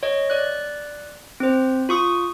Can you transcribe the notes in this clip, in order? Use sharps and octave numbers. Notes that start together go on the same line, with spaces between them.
C#5 D#5
D5 F#6
C4 C5
F4 C#6 D#6